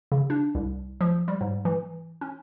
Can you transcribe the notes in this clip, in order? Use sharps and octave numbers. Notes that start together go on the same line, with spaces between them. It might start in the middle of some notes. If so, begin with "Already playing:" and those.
C#3
D4
C2
F3
G3
G#2
E3
C#4